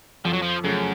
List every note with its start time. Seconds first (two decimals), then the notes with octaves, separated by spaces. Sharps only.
0.25 F2 F3
0.33 F#3
0.42 F3
0.64 F#2 C#3 A3 C#4